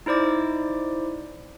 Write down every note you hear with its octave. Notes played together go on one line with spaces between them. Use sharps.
D#4 E4 C5 D5 D6